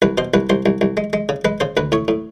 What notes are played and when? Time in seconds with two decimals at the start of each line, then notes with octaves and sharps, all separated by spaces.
0.02 C2 B4
0.18 B2 C5
0.34 C2 B4
0.50 C2 C5
0.66 C2
0.81 C2
0.97 G#3
1.13 G#3
1.29 C#3
1.45 G#3 B4
1.60 C#3 C5
1.77 D2 B4
1.92 A2 C#5
2.08 A2